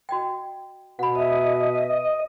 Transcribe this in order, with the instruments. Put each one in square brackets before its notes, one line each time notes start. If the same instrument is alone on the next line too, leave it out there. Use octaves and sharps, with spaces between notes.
[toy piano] F#4 D#5 G5
[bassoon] B2 [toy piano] F#5 B5
[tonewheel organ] D#5 [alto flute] E5